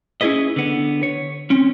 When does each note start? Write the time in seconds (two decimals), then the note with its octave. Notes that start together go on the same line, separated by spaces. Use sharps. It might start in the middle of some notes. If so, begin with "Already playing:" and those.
0.21 C#4 E4 F4 G#4 B4 D#5
0.56 D3 B3
1.03 C#5
1.50 C4 C#4